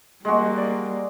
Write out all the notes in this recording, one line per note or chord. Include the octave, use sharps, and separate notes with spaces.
G3 G#3 A#3 F#4
D5